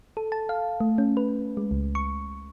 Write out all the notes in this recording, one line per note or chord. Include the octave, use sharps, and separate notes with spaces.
A4
A5
F5
A3
C#4
B4
G#3
C#2
C#6